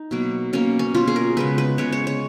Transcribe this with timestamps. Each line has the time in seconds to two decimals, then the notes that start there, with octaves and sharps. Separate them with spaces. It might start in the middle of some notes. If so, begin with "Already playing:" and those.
Already playing: D#4
0.11 B2 F#3 A#3
0.53 B2 A#3 C#4
0.79 C#4
0.94 B2 A#3 F4
1.08 G#4
1.16 A#4
1.37 C#3 G#3 B3 B4
1.58 B4
1.78 C#3 G#3 B3 C#5
1.92 C#5
2.07 C#5